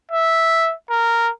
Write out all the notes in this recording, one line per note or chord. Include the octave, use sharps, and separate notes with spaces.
E5
A#4